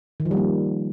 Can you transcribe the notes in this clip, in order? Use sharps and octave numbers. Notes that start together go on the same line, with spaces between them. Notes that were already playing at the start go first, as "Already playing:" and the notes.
D#3
F3
G3
A#3